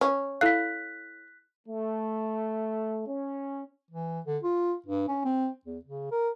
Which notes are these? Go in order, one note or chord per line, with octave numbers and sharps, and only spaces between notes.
C#4
E4 A4 F5 F#6 B6
A3
C#4
E3
D3
F4
G2
C#4
C4
E2
C#3
A#4